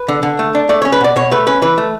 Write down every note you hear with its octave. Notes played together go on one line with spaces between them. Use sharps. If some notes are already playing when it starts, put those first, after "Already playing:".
Already playing: B4
D3
D3
A3
D4
A3 D5
C#4 C#5
B4
B2 D5
B2 C#5
A3 B4
C#4 B4
E3 B4
A3